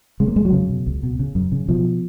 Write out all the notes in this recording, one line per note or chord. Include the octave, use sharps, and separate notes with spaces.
C#3 G#3
A#3
F2 G#3
F#3
C#3
B2
C#2
B2
C#3
F#2
C#3
B2 F3